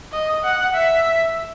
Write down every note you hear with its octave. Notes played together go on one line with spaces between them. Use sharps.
D#5
F#5
E5